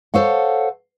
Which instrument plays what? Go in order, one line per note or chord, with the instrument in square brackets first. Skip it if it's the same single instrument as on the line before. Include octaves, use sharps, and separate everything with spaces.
[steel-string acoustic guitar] A4 C5 C#5 F5 F#5